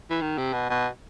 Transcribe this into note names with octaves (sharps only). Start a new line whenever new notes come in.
E3
D#3
C3
B2
B2